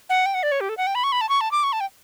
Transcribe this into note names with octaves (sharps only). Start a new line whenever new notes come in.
F#5
G5
F#5
D5
C#5
G4
A4
F#5
G5
B5
C#6
B5
A5
C#6
A5
D6
C#6
A5
G5